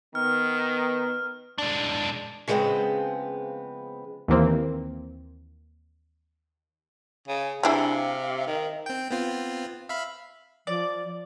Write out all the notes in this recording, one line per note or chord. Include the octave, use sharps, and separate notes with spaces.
D#3 B3 F6
G#3 D4
C#3 F3 G#3 B3 C4
D#2 E3 A#3 C4
C#3
C3 G3 D4 E4 G#4 A#5
F5
D#3
C4 G5
B3 C4 F4
E5 F5 B5
F3 D5